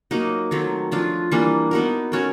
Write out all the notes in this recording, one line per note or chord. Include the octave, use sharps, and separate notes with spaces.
F#3 A#3 D#4 F#4
D#3 F#3 A3 C4
F3 A3 D4 F4
E3 G3 A#3 D4
B3 D#4 F#4 A#4
A3 C#4 F#4 A#4